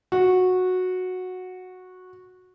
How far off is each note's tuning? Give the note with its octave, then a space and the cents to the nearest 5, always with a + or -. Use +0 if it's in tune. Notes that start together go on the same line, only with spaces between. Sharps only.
F#4 -10